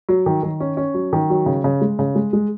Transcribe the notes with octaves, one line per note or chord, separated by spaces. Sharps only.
F#3
D#3
D#3
C#4
C#4
F#3
D#3
F#3
C#3
C#3
G#3
C#3
G#3
G#3